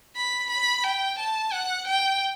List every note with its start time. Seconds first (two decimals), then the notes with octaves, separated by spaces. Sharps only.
0.16 B5
0.51 B5
0.84 G5
1.19 A5
1.53 F#5
1.88 G5